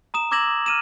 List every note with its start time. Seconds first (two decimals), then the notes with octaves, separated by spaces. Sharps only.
0.14 A#5 D#6 E7
0.31 D6 E6 G#6 A#6 E7 F#7
0.66 F6 D#7 E7